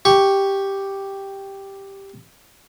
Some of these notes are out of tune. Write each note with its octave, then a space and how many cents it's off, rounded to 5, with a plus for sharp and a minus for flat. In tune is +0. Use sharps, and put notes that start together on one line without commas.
G4 +0 C#6 +0